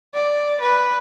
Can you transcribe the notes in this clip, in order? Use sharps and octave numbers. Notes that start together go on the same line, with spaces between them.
D5
B4